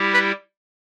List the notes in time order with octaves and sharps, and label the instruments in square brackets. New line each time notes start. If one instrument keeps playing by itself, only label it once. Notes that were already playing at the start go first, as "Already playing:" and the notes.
Already playing: [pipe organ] G3 E4 G4
[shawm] B4